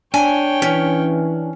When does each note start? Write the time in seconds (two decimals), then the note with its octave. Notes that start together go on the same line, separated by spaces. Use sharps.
0.14 D4 C#5 G5 G#5
0.62 E3 C#4